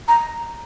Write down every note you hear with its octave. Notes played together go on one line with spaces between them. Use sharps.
A#5